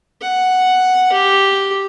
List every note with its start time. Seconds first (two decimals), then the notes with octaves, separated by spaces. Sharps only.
0.21 F#5
1.12 G4